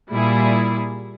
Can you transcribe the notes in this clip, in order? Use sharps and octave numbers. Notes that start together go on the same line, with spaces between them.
A#2 G3 E4 G#4